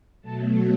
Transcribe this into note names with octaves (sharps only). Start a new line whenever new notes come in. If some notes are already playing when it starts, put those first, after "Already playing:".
B2 F#3 A3 A5